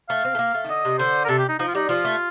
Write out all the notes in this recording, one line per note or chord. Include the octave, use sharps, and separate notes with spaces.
A3 F5
C4
A3
A#3
A3
D#3
D3 D#5
C3
D3 C5
A#4
C3 A4
G4
D#4
F3 D#4
F4
G3 D#4
F3 F4
A3